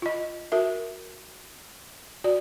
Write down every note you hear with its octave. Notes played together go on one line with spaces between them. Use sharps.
F4 D#5
F#4 A#4 E5
F#4 D5